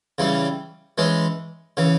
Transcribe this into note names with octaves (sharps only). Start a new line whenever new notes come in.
C#3 E3 G3
E3 G#3 C#4
C#3 E3